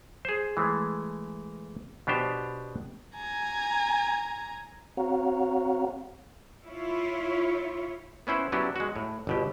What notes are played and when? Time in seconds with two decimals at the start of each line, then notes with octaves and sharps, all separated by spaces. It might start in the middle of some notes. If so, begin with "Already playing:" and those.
0.25 G#4 C5
0.57 E3 G#3 A3
2.07 B2 B3 D4 G4 C5
3.16 G#5 A#5
4.97 C4 F#4 C#5 F5 F#5 A#5
6.64 E4 F4 C#5
8.27 B3 C#4 E4 C5 F#5
8.52 F#3 B3 C#4 D4 E4 G4
8.76 G#3 F#4
8.96 A2
9.27 G1 B2 G4